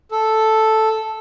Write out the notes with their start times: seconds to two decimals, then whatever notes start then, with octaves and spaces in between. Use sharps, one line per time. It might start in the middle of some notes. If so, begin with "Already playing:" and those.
0.12 A4